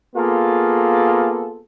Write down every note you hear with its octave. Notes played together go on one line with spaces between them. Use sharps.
A#3 B3 F4 G#4 A4